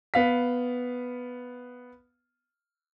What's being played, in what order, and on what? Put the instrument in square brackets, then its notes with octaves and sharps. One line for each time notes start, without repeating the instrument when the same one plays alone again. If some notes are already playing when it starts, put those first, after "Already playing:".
[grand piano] B3 F5 B6